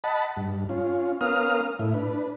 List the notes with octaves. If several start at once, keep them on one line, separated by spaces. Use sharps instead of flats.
D#5 F#5 A5 B5
G2
C#4 F4
B3 C#4 A#4 F5 D#6 F6
A2 E4
D4 B4